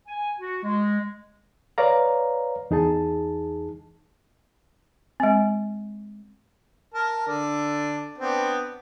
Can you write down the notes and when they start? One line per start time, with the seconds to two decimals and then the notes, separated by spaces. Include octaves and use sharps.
0.07 G#5
0.39 F#4
0.64 G#3
1.78 B4 C#5 D5 F5 A#5
2.71 E2 D#4 G#4 A5
5.20 G#3 C4
6.94 A#4 A5
7.27 D3 D4
8.18 B3 C4 D4